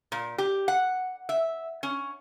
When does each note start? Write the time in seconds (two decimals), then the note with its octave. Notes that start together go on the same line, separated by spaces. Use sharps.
0.12 A#2
0.38 G4
0.68 F#5
1.29 E5
1.83 C#4